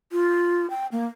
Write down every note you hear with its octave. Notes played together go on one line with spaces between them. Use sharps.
F4
G5
A#3